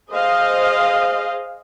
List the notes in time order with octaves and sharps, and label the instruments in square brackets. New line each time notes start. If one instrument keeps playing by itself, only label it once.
[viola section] G#4 C5 D#5 F5